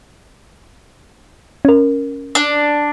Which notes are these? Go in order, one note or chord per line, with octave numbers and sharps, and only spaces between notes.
C#4 A#4
D4